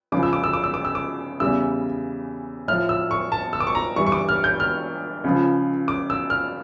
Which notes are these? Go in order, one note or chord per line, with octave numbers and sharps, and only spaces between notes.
C#2 C#3 F3 D6
E6
D6
E6
D6
E6
D6
E6
D6
E2 C#3 E3 G3 E6
A2 F3 F6
E6
C#6
A5
E6
D6
C#6
A#5
G2 E3 G3 C#6
C#6
D6
F6
G6
F6
C#2 C#3 F3
D6
E6
F6